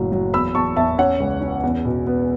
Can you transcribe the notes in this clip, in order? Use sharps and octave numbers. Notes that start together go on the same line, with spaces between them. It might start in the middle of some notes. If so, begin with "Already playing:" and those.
Already playing: F#1 A2 F#3
F#3
E2 B5 E6
E2 A5 C#6
E2 E5 A5
C#4 C#5 F#5
C#2
C#4
E2
B2
B3